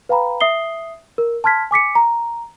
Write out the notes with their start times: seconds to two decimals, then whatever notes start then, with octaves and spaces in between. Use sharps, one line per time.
0.09 B4 F5 G5 A#5 B5
0.41 E5 D#6 C7 G7
1.18 A#4
1.44 A5 C6 F6 G#6 B6
1.71 G#5 D6 B6 C#7
1.95 A#5